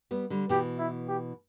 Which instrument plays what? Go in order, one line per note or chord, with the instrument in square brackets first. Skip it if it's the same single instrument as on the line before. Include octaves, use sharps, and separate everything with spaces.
[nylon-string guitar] G3 B3
D3 G3
[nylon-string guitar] B2 E3 [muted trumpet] G4
[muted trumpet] E4
G4